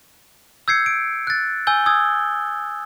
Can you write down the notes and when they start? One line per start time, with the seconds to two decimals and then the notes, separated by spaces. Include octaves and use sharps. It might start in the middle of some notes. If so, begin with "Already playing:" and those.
0.68 E6 G6 G#6 C7 C#7
0.86 D7
1.27 F#6 A6
1.67 G#5 E6 G6 G7
1.86 D#6 E6 G#6